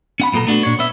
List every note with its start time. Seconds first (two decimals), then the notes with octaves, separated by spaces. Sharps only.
0.20 C#4 F#5 B5
0.32 B1 A#2 B3 A4 A#5
0.47 A3 B3 D4 D#4 F#4
0.63 A#2 D4 C#5
0.79 B3 C#4 E5